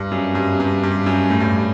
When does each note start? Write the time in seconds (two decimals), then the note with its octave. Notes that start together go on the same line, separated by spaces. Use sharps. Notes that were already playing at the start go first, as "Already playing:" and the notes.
Already playing: G2
0.11 F#2
0.35 G2
0.60 G2
0.83 G2
1.06 F#2
1.30 A2
1.40 G2